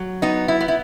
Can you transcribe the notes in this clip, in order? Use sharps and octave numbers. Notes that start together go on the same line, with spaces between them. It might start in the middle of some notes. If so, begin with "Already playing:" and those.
Already playing: F#3
B3 D#4
E4
B3
E4